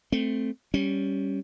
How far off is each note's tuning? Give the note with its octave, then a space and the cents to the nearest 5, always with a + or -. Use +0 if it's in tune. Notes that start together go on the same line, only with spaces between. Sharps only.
A3 +0 C4 +0
G3 +0 C#4 +0